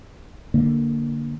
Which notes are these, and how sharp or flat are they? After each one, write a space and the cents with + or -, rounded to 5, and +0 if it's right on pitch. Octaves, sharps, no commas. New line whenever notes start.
D3 +0 A#3 +0